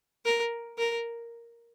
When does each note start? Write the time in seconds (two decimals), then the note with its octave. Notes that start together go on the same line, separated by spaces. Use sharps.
0.25 A#4
0.78 A#4